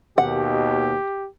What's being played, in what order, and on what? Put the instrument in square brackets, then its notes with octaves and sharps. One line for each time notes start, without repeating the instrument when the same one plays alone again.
[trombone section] D#2 B2 [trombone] G4 [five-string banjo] F#5